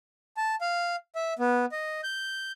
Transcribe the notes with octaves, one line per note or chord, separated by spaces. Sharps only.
A5
F5
E5
B3
D#5
G6